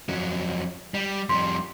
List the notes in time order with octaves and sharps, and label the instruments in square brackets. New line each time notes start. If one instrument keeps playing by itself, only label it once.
[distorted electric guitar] F2 F#3
G3
[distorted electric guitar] F2 G3 [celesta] C6